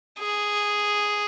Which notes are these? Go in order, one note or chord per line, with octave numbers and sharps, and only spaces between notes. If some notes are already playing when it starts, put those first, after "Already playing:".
G#4